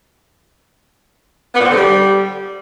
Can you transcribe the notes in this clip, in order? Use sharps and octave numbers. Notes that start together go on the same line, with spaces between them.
B3
A#2
C4
D3
G3